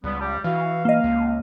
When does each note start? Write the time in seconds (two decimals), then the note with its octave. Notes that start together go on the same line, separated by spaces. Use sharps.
0.04 C#2 G3 B3
0.19 G3
0.44 E3 F#4 F5
0.85 A#3 D#5 F5
1.04 C#2